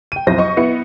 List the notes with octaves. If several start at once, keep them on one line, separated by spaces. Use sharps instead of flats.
G5 D#7
B1 F2 E4 C5 G6 A#6
D#5 C#6
B3 E4 C#7